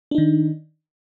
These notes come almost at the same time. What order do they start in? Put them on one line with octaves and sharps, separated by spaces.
D4 D#4 D#3